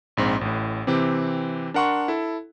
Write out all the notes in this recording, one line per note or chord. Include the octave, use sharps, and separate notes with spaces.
A#1 G#2 C4
A1 A2
C3 E3 C4 G4
D4 A#4 F#5 C6 C#6
E4 A4